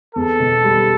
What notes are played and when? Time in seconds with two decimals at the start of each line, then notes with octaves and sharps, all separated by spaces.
0.15 E2 A4
0.40 B2
0.64 G3